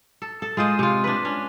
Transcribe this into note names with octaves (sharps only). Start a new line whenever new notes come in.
A4
A4
G#3 F4 C5 D#5
C3 F4
D4 B4
C#4 D4